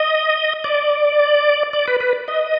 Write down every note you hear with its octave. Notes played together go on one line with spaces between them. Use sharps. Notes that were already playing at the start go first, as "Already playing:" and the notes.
Already playing: D#5
D5
D5
B4
B4
D#5